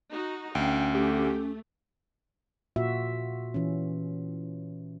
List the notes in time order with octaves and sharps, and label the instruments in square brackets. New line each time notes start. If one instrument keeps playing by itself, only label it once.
[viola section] D#4 F#4
[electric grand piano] D2 [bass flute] C#4 [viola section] F5 [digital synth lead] G5
[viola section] A3 [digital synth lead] G4
[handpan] A#2 F4 F#4 E5
E3 C#4